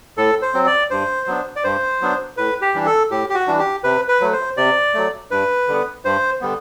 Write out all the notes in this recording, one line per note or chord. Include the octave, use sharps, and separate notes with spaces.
A2 A4
C5
F#3 C4
D5
G2 C5
F#3 B3 D4
D5
G2 C5
F#3 B3 D4
A2 B4
G4
E3 G3 D4
A4
A2 G4
G4
F#4
E3 G3 D4
G4
C3 B4
B4
F#3 A3
C5
C3 D5
F#3 A3
G2 B4
D3 G3 B3
G2 C5
D3 G3 B3